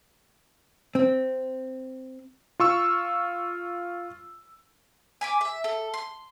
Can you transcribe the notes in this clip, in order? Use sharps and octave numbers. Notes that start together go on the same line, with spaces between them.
C4
F4 C#6 E6
G#5 B5 D6
E5
A4
C6